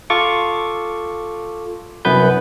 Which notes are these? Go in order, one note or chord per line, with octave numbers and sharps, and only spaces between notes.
F4 A4 C#6 D6
C2 F#2 B3 B4 G6